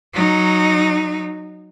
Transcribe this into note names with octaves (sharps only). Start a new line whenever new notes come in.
F#3 D#4